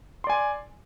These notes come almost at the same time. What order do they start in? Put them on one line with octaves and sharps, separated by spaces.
C6 D5 G#5